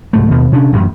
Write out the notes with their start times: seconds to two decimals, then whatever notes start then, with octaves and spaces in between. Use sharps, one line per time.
0.13 C2 G#2 A3
0.29 D#2 B2
0.52 C3 C#4 D4
0.72 E1 A1 F#2